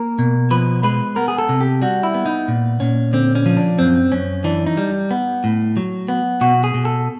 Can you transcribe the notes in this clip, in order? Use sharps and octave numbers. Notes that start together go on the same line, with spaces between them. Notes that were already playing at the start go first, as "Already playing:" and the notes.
Already playing: A#3 A#4
B2
F3 B4
G#3 B4
B3 A#4
G#4
A4
C3
G4
G3 F#4
E4
B3
D#4
A#2
A#2 C#4
D3 C4
C#4
F3
D4
F#2 C4
F#2 C#4
E3 D4
D#4
G3
B3
A2
F#3
B3
B2 F#4
G#4
B2
A4